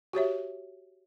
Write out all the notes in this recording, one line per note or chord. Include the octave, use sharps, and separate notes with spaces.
F#4 G4 C#5 E5